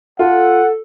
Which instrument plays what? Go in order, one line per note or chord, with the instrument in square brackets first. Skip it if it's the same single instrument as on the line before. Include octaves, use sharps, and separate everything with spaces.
[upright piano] F4 [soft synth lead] A4 [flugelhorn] F#5